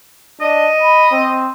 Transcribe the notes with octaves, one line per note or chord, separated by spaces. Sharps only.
D4 D#5
B5
C4